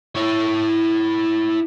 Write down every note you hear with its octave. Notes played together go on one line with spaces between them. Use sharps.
E4 C#5